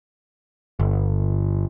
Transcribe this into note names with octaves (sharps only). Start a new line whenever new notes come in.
G1